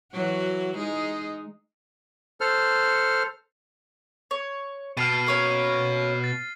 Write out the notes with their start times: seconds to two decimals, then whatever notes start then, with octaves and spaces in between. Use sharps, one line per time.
0.13 E3 F#3 F#4
0.77 G#3 D#4 G#4
2.41 A4 C5 F6
4.31 C#5
4.97 B2 A5 F6 C7 D#7
5.27 A#3 C#4 C#5 C7
6.24 A6